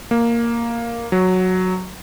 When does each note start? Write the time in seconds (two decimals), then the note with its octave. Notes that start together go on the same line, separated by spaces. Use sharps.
0.11 A#3
1.12 F#3